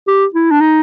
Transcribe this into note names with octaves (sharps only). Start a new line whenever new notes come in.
G4
E4
D4
D#4